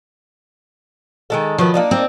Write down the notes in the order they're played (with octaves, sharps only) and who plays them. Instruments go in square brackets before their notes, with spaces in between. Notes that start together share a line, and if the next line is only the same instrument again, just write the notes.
[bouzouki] D#3 G#3 A4
[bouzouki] D#3 F#3 B4 [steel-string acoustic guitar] F3
[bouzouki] A#3 D4 D#4
[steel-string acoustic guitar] C4